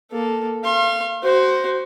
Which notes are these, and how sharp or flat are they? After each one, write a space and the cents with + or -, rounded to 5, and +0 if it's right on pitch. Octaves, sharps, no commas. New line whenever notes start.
A#3 +0 A4 +0
F5 -25 C6 +40
F#4 +20 C5 +0